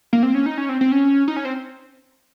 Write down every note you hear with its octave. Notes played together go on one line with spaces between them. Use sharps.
A#3
C4
C#4
D#4
C#4
C4
C4
C#4
D#4
C#4
C4